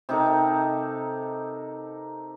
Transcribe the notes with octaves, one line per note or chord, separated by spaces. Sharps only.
C3 D#4 A4 A#4